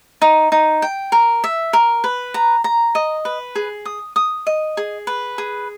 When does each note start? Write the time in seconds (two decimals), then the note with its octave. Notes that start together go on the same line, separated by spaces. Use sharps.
0.22 D#4
0.52 D#4
0.82 G5
1.12 A#4
1.44 E5
1.73 A#4
2.04 B4
2.34 A#5
2.64 A#5
2.95 D#5
3.25 B4
3.55 G#4
3.85 D#6
4.16 D#6
4.47 D#5
4.77 G#4
5.07 B4
5.38 G#4